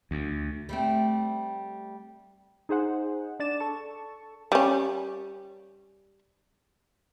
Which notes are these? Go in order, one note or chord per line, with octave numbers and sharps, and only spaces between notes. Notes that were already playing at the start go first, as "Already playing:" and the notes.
D2
G3 A3 C4
D#4 G#4 C5 F#5
D4 D5 A6 E7
A4 A5 C#6
G3 C#4